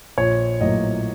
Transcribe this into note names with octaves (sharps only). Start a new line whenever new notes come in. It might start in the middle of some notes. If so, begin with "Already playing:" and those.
A#1 C#5
A2 F#3 A#3 D#5